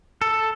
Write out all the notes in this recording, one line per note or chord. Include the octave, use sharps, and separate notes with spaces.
A4